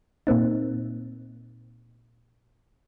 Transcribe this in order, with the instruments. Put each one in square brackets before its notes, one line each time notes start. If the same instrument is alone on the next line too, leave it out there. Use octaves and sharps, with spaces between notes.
[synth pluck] A#2 A#3 C4 D#4